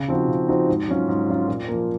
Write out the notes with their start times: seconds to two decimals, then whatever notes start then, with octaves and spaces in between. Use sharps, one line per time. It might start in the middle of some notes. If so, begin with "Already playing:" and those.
Already playing: C#3
0.08 F3 C4 D#4 F#4
0.28 C#3
0.48 F3 C4 D#4 F#4
0.69 G#2
0.88 F#3 C#4 F4
1.08 G#2
1.28 F#3 C#4 F4
1.48 A#2
1.68 F3 A#3